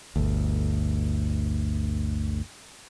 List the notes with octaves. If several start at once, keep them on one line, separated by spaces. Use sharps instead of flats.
G1 D2